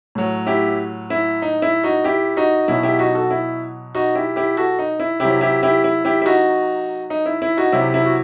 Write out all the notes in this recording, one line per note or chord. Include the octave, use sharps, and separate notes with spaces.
A2 F#3
E4 G4
E4
D#4
E4
D#4 F#4
E4 G4
D#4 F#4
B2 F#3 E4
E4 G4
D#4 F#4
F#4 A4
E4
D#4 F#4
E4 G4
E4 G4
F#4 A4
D#4
E4
C3 F#3 E4 G4
E4 G4
E4 G4
E4
E4 G4
E4
D#4 F#4
D#4
E4
E4
D#4 F#4
C3 F#3 E4 G4
E4
F#4